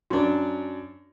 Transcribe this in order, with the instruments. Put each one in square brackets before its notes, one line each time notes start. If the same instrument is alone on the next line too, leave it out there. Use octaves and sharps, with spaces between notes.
[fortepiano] F#2 D4